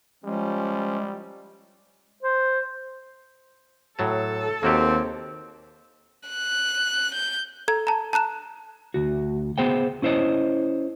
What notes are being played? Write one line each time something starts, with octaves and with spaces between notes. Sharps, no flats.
F3 G3 G#3 C#4
C5
A2 F#3 A4 A5
D#2 A#3 C4 F#4 G4
F#6
G6
A4 A#5 G#6
A5 A#5
A5 A#5 F#6 E7
D2 F#4
B3 G#4 C5 F#5 G5
C#4 E4 C5 C#5 D#5